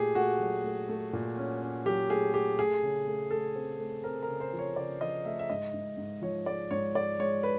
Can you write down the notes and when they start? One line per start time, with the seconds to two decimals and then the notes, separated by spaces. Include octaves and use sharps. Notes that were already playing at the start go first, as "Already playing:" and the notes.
Already playing: A#2 A3 G4 G#4
0.15 A3 F#4
0.40 F#3
0.64 A3
0.89 A3
1.13 A#2
1.37 C#4
1.61 C#4
1.86 F#3 G4
2.09 A3 G#4
2.34 A3 G4
2.59 A3 G#4
2.83 C#3
3.07 A3
3.31 A3 A4
3.55 C4
3.79 A3
4.04 C4 A#4
4.23 A#4
4.28 C#3
4.40 C5
4.53 F3
4.59 C#5
4.76 C#3 D5
5.00 F3 D#5
5.25 A3 E5
5.39 E5
5.50 G#2 D#5
5.74 G#2
5.97 G#2
6.22 F3 C#5
6.46 G#3 D5
6.71 G#2 C#5
6.95 G#3 D5
7.19 G#3 C#5
7.43 B4